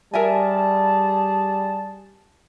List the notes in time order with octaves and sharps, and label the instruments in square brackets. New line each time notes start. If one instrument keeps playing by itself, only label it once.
[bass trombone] G3 [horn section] G#4 A5 [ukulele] A#4 E5 G#5